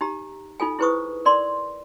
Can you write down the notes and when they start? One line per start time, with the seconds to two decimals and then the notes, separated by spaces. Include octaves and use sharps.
0.01 D#4 G4 A#5
0.60 D#4 F4 A4 G#5
0.79 E4 G#4 B4 C5 C#6 D#6
1.25 A#4 D5 C6